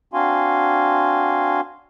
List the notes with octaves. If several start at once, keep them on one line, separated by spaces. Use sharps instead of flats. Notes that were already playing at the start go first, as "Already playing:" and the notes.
C4 D4 F#4 F5 G#5 C6